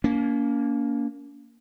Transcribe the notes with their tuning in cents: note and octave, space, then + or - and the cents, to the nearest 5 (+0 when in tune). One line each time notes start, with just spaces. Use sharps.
A#3 +5 C#4 +45